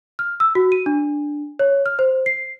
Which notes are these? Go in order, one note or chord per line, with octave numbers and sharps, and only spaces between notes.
F6
E6
F#4
D#7
D4
C#5
F6
C5
C7